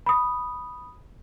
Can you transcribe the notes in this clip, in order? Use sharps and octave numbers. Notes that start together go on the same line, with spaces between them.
B5 D#6